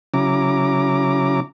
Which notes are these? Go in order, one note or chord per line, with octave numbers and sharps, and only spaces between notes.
C#3 F#3 C#4 E4 A#5 D6